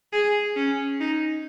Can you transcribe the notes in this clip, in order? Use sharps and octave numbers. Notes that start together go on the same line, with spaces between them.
G#4
C#4
D#4